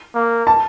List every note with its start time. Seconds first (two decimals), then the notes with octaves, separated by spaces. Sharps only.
0.14 A#3
0.47 A5